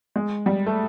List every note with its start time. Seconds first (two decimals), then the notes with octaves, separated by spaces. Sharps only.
0.16 G#3
0.46 G3
0.66 A3